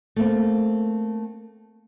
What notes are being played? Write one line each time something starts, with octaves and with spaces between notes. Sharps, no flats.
A3 A#3 C4